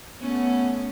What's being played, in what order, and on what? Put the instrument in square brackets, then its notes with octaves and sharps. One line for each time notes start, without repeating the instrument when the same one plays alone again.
[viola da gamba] A3 C#4 [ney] B3